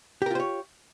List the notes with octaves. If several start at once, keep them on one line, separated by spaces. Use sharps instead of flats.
F4 G4 A#4 C5 C#5